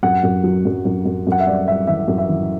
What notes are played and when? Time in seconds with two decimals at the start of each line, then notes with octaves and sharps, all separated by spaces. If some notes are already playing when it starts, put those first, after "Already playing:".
0.03 F#2 F#5
0.23 F#2
0.44 F#3
0.65 F#2
0.85 F#2
1.06 F#2
1.27 F#2 F#5
1.40 E5
1.47 G3 D5
1.68 G3 E5
1.87 E3 E5
2.08 F#2
2.18 E5
2.29 E3